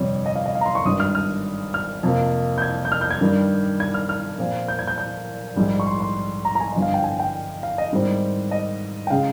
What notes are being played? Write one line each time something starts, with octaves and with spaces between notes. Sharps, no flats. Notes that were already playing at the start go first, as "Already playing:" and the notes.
Already playing: G1 F2 C3 G3 C#5
D#5
F5
D#5
F5
A#5
C6
C#6
G#1 G2 D#3 D#6
F6
F6
F6
F2 C3 F3 A#3
G6
G#6
G6
F6
G6
G#6
G2 D#3 G3
G#6
F6
F6
A#2 F3 C4
G6
G#6
G6
G6
A#1 G#2 G3
C#6
C6
C6
A#5
A#5
G#5
G1 G2 F3 D#5
F5
G5
G#5
G5
F5
D#5
G#2 D#3 G3 C4
D#5
G5
C#3 G#3 F5